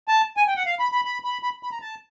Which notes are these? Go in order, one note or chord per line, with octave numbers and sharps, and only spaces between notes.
A5
G#5
G5
F#5
F5
B5
B5
B5
B5
B5
B5
A#5
A5